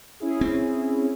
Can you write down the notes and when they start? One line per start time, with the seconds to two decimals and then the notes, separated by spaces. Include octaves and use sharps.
0.20 C#4 E4 G#4
0.41 C4